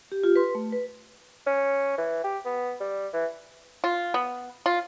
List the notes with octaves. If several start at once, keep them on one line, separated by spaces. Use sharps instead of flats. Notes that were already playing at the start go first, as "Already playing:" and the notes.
G4
F4 G4
B4 C6
A3
B4
C#4
E3
G4
B3
G3
E3
F4
B3
F4